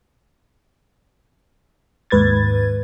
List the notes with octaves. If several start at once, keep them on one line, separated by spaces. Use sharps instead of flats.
D#2 G#2 B4 G#6 A6